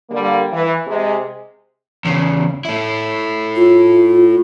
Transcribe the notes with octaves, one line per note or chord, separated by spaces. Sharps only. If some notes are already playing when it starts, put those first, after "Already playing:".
D3 G3 A#3
E3
C3 G#3
E2 C#3
A3 E4
F4